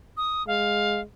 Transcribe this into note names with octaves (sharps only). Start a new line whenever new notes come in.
D#6
G#3 F5